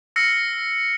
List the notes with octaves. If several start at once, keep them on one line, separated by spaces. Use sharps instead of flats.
E6 F6 A#6 C7 C#7